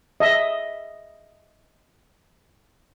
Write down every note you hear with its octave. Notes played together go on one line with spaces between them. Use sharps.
D#5 E5